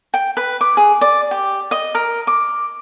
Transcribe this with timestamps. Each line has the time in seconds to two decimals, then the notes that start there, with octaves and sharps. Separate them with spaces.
0.14 G5
0.37 B4
0.61 D6
0.77 G#4
1.01 D5
1.31 G4
1.71 D#5
1.95 A#4
2.27 D6